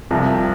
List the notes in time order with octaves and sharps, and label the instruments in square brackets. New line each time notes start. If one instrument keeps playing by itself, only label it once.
[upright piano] C2 C3 F3